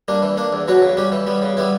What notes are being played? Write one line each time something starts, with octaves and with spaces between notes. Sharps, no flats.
G3 A#3 D4
E3
A#3 D4
E2
B2 F#3 C#4 F#4
C#3
G3 C#4 G4
E3
G3 B3
C#3
G3 B3 E4